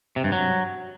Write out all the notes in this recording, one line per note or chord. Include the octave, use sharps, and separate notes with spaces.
C3
G2
F#3